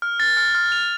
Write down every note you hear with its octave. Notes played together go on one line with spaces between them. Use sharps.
F6
A6
F6
F6
F7